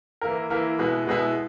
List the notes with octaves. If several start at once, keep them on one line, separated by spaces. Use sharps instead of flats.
E3 A#3 E4 A#4
E3 A#3 E4 A#4
B2 G#3 B3 E4
B2 G#3 B3 E4